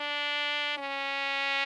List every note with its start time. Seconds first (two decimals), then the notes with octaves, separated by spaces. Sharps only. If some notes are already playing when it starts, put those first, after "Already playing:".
Already playing: D4
0.78 C#4